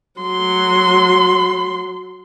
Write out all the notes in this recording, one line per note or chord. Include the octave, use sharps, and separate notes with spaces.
F#3 C6